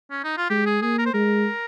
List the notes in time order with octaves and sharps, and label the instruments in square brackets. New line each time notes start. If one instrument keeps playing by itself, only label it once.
[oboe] C#4
D#4
F4
[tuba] G#3 [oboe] G4
[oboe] G#4
[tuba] A#3 [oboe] G#4
[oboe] A#4
C5
[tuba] G#3 [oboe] A#4